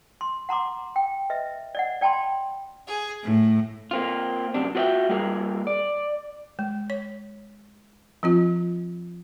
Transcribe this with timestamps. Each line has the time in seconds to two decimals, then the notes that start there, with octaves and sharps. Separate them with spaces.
0.21 C6
0.49 F#5 A#5 C6 D6
0.96 G5
1.30 B4 D#5 E5
1.75 D5 D#5 F#5
2.01 D5 G5 A5 B5 C6
2.87 G#4
3.24 A2
3.91 A#3 C4 F4
4.54 F#2 C3 D4
4.75 F4 F#4 B4 D5 E5 G5
5.09 G3 A#3 F4 G#4 A#4
5.67 D5
6.59 G#3
6.90 C#5
8.23 F3 C4 F4